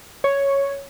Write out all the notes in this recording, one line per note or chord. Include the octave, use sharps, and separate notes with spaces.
C#5